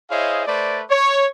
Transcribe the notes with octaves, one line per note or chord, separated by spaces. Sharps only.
E4 G#4 C5 C#5 D#5 F5
A3 B4 C5 D5
C#5